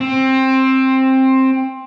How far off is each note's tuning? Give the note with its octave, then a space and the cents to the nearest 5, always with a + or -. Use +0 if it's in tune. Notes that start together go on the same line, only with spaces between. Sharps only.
C4 +15